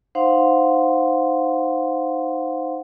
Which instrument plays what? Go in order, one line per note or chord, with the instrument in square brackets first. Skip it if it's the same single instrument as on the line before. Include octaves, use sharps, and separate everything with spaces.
[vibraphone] D#4 C5 F5 F#5 C6